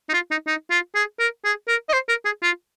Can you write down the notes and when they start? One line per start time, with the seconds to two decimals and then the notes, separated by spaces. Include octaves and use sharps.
0.09 D#4
0.14 F4
0.31 D#4
0.47 D#4
0.71 F4
0.95 G#4
1.20 A#4
1.45 G#4
1.68 A#4
1.89 D#5
1.93 C5
2.09 A#4
2.25 G#4
2.43 F4